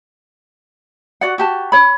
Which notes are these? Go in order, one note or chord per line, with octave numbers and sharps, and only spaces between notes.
F#4 D5 F#5
F#4 G4 A5
C#5 B5